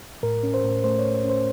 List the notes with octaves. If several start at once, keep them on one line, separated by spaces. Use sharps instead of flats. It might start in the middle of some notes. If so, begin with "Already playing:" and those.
A2 A#4
C#4
C5
A2
A3 C5
C#5
A2
C#4
C5